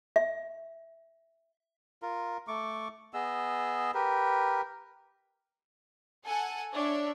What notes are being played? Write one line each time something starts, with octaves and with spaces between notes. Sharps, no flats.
E5
F4 A#4
A3 C#6 D6
B3 G#4 D#5 E6
G4 A#4 B4
A4 F#5 G#5
D4 C#5 E5